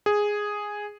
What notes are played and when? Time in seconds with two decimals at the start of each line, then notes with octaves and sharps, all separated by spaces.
0.06 G#4